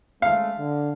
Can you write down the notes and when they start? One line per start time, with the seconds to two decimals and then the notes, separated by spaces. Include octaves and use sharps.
0.22 G#3 A3 C#4 F5
0.58 D3